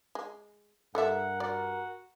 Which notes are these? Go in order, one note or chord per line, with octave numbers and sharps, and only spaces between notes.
G#3
G2 A4 A#4 D5 E5 F#5
F#4 D5